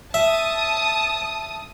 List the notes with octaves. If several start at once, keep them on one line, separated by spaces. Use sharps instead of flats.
E5 A5 D#6